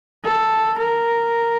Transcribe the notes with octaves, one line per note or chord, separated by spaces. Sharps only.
A4
A#4